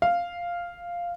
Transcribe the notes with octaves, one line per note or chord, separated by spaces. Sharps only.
F5